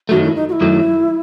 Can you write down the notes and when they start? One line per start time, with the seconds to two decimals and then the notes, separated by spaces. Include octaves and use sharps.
0.09 F#2 D#3 F#3 A3 F#4
0.23 E4
0.35 D#4
0.49 F#4
0.52 E4
0.61 F#2 D#3 F#3 A3